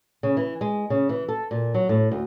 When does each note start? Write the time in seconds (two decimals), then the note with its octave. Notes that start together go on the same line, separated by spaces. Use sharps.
0.23 C#3
0.37 E3
0.61 G#3
0.90 C#3
1.09 E3
1.28 A4
1.51 A#2
1.74 F#3
1.89 A2
2.12 D2